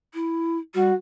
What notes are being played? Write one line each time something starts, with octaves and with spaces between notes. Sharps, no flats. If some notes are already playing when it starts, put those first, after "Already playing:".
E4
G3 F#4